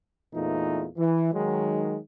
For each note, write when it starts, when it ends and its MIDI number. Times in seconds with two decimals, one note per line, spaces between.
0.34 0.87 40
0.34 0.87 46
0.34 0.87 52
0.34 0.87 57
0.34 0.87 63
0.34 0.87 65
0.97 1.31 52
1.34 1.98 51
1.34 1.98 54
1.34 1.98 56